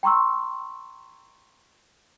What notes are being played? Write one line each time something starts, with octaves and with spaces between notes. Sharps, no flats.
G5 A#5 C6 C#6 E6